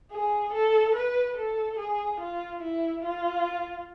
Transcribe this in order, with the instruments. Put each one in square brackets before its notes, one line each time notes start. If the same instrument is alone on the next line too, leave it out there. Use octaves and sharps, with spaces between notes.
[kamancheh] G#4
A4
B4
A4
G#4
F4
E4
F4